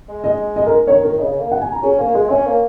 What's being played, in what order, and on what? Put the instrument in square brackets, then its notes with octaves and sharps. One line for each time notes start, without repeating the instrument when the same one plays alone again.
[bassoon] G#3
[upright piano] D#5
D#5
A#4
[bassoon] D#3 [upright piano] C#5
[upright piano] A#4
[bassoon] C#3 [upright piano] D#5
[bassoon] C#3
A#3
[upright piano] F#5
G#5
A#5
[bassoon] C#4 [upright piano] G#4
[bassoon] A#3 [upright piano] A#4
[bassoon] G#3 [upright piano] G#4
[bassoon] C#4 [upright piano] C#5
[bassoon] A#3